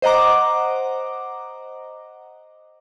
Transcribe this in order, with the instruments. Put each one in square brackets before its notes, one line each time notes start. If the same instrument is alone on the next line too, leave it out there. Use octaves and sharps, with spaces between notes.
[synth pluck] C5 D#5 F#5 A#5 D6